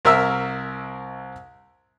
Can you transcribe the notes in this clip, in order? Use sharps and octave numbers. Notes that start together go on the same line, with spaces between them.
C2 A#4 E5 E6